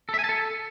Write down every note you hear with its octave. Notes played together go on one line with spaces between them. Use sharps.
A4
E5
G#5
A5
A4